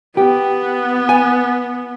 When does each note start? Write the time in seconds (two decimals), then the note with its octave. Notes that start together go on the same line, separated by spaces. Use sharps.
0.17 B3 G4
1.09 G#5